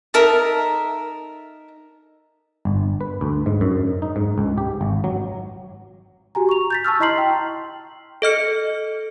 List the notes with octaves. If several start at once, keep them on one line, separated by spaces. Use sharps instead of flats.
D#4 A4 A#4 E5
G1
B4
D2
G#2
F#2
D#4
G#2
C#2
G4
G#1
F#3
F#4 G4 G#5 A#5
C#6 F7
G6 A6 B6
A5 C#6 E6 F6
E4 D#5 A#5 C6 C7 F#7
G5
A4 D#5 F6 C#7